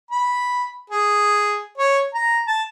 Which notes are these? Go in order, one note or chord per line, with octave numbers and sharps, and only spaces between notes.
B5
G#4
C#5
A#5
A5